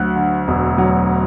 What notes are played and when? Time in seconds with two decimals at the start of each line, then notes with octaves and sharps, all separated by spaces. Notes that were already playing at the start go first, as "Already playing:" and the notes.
Already playing: D2 F#3 F#6
0.16 D3
0.48 E1
0.78 F#3